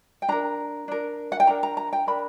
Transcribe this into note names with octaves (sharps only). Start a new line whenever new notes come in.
G5
D4 A#4 A#5
D4 A#4
F#5
G5
D4 A#4 A#5
A#5
A#5
G5
D4 A#4 B5